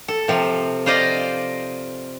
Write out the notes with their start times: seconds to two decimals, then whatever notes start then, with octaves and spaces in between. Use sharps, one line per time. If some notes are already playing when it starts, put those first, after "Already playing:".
0.08 A4
0.28 C3 F3
0.86 F4 C5 D5 D#5 F5